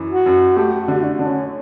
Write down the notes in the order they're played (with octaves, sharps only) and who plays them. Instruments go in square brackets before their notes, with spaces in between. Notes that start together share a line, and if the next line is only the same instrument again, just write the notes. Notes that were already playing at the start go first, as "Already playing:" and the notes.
Already playing: [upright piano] F#2 E3
[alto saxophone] F#4
[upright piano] F#2
[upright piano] A3 [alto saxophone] G4
[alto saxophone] F#4
[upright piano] D3
[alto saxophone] D4
[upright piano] D3
[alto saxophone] C#4